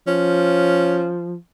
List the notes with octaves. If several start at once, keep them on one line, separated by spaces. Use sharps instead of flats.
F3 C#4